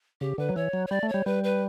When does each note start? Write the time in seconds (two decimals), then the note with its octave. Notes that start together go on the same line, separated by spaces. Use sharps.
0.21 C#3 G4
0.38 D3 B4
0.49 F#3
0.56 E3 C#5
0.73 F#3
0.87 C#5
0.91 G3 D5
1.03 A3
1.09 C#5
1.14 G3
1.26 G3 B4
1.44 B4